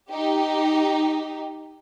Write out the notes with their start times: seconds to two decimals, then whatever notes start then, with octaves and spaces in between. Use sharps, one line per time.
0.11 D#4 G4